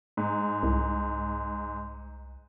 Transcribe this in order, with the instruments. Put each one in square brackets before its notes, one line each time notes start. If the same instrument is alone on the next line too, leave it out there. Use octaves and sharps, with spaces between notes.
[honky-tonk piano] G#2
[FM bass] C2